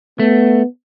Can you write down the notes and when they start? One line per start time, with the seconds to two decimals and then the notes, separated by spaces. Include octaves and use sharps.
0.20 A3 B3